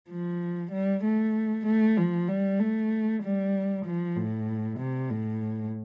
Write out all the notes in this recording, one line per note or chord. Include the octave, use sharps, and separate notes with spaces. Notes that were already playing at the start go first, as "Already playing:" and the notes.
F3
G3
A3
A3
F3
G3
A3
G3
F3
A2
C3
A2